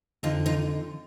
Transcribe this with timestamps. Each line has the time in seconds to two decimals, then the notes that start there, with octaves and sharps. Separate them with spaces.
0.23 F2 D3 D#4 F4
0.46 D#4 F4